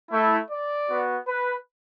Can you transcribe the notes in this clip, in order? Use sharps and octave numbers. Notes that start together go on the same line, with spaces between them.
A3 E4
D5
B3 F#4
B4